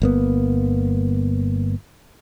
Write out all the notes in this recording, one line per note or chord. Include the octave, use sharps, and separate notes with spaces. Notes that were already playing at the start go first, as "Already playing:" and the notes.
G1 A#3 B3